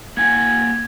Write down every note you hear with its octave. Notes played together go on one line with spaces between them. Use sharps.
A#3 F#5 G#5 G#6